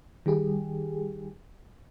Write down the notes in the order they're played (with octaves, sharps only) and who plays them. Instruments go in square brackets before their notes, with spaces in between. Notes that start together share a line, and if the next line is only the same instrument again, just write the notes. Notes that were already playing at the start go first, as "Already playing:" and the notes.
[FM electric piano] D#3 G3 G4 G#4